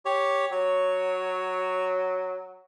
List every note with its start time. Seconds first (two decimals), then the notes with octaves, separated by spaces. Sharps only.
0.05 G4 C#5
0.52 F#3 C#5